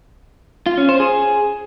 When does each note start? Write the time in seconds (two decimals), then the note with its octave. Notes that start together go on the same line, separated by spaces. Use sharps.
0.66 F4
0.78 C#4
0.89 C5
1.00 G#4